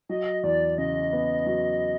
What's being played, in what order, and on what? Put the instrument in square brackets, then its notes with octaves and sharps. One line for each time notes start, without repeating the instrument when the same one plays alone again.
[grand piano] F#3 [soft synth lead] D#5
[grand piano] E2 [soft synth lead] D5
[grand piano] C#3 [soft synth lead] D#5
[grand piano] B3
F#3